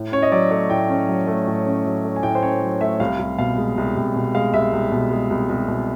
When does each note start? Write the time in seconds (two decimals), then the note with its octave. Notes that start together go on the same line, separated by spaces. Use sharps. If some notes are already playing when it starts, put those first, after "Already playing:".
Already playing: A2
0.12 C#4 C#5
0.22 D#5
0.32 F#3 D5
0.51 A3 C#5
0.70 A2 G5
0.90 C#4
1.08 F#3
1.27 A3
1.47 A2
1.66 C#4
1.85 F#3
2.05 A3
2.16 G#5
2.23 A2 G5
2.35 C5
2.42 C#4 C#5
2.62 F#3
2.81 A3 E5
3.00 C2 F5
3.19 C2
3.38 B2 F5
3.58 G#3
3.78 C2
3.97 C2
4.16 B2
4.35 G#3 F5
4.53 C2 E5
4.73 C2
4.92 B2
5.11 G#3
5.30 C2
5.49 C2
5.68 B2